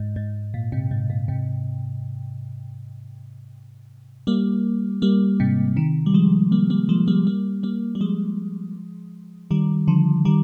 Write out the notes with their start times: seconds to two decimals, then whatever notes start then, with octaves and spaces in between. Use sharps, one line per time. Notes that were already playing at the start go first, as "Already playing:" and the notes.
Already playing: G#2
0.16 G#2
0.54 A#2
0.72 G#2 C3
0.91 G#2
1.10 A#2
1.28 G#2 C3
4.27 G3 A#3
5.02 G3 A#3
5.40 G#2 C3
5.77 C3 D#3
6.06 G3
6.14 F3 G#3
6.52 G3 A#3
6.70 G3 A#3
6.89 F3 G#3
7.08 G3 A#3
7.27 G3 A#3
7.63 G3 A#3
7.95 G3
8.01 F3 G#3
9.51 D#3 G3
9.88 D3 F3
10.25 D#3 G3